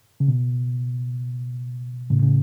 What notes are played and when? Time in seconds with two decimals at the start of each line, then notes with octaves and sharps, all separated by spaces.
0.20 C#3
0.28 B2
2.10 A2 C#3
2.22 C#3